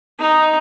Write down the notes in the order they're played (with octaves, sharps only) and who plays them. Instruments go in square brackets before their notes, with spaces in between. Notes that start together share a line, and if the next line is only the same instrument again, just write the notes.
[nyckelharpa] D#4